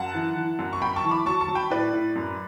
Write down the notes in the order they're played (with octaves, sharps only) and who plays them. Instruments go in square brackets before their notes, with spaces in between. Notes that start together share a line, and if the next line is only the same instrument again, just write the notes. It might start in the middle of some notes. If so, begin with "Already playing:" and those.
Already playing: [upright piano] F#2 F#5 A5
E3
E3
F#2
C#6
F#2 G5 B5
A5 C#6
E3
B5 D6
F#3 A5 C#6
A5 C#6
F#3
G5 B5
A2 B4 D5
A2
F#2